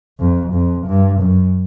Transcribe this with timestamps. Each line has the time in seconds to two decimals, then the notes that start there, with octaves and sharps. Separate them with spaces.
0.19 F2
0.52 F2
0.87 G2
1.20 F#2